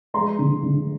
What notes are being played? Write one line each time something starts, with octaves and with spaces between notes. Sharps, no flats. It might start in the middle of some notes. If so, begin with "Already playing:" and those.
G#3 A#5 C6
D3
D3